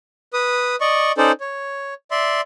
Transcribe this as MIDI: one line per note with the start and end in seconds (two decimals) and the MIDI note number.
0.33 0.76 71
0.33 0.76 87
0.81 1.12 74
0.81 1.12 75
0.81 1.12 85
1.18 1.32 61
1.18 1.32 63
1.18 1.32 69
1.18 1.32 72
1.18 1.32 74
1.41 1.94 73
2.11 2.41 74
2.11 2.41 76
2.11 2.41 84